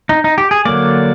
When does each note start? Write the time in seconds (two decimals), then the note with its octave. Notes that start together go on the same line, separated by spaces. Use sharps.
0.09 D#4
0.24 D#4
0.38 G4
0.51 G#4
0.65 D3 F#3 A#3 D5